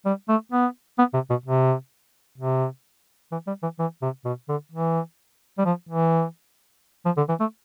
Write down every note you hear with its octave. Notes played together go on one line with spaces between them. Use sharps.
G3
A3
B3
B3
C3
B2
C3
C3
E3
G3
E3
E3
C3
B2
D3
E3
G3
F3
E3
F3
D3
E3
A3